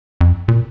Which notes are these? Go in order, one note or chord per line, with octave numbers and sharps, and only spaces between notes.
F2
A#2